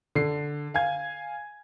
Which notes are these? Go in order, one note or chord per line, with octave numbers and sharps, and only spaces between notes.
D3 C7
F5 G#5 G#6